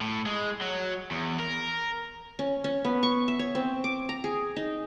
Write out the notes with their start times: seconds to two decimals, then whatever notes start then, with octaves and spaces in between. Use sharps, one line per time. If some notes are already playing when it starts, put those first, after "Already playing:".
0.01 A2
0.26 G#3
0.61 F#3
1.11 E2
1.40 A#4
2.39 C#4
2.64 C#4
2.84 B3
3.03 C#6
3.28 E5
3.39 C#5
3.55 C4
3.84 D6
4.09 A#5
4.24 G#4
4.56 D#4